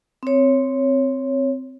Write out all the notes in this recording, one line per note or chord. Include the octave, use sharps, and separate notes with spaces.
C4 C#5